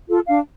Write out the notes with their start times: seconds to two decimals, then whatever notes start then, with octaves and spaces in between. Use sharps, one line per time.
0.08 F4 A4
0.27 D4 F5